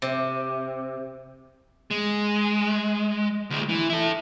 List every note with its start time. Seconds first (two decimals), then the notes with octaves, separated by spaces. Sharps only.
0.02 C3
1.91 G#3
3.50 D2 G#3
3.69 E3
3.90 E4 A4